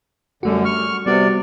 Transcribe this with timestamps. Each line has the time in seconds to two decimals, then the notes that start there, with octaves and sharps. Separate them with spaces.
0.43 F#2 D3 G3 A3 F#4
0.65 C#6 F6
1.06 C3 G3 B3 F#4 D5